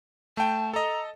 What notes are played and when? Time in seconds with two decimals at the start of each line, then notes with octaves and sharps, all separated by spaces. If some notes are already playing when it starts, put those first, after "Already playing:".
0.37 A3 G5 A5
0.73 A4 D#5 A#5